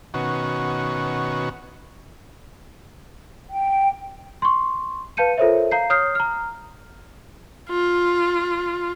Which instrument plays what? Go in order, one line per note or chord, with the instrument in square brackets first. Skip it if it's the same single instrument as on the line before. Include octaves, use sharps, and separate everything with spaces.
[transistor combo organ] B2 D#3 C#4 F#4
[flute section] G5
[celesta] C6 C#6
B4 F5 A5 G6 C#7 D#7
F4 A4 A#4 C5 C#5 E5
F5 A#5 G6 C7
C#5 D#6 F6 G6 C7
A#5 F6
[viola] F4